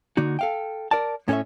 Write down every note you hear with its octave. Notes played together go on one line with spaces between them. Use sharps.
D3 A#3 D#4 F#4
A4 F5 G5
A#4 D5 A5
A2 C#4 A4 C5 C#5 E5